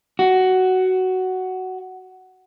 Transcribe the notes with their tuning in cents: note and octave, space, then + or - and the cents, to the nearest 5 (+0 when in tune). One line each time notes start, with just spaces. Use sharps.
F#4 +10